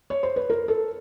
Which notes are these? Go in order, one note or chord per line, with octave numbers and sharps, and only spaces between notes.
C#5
C5
B4
A#4
A4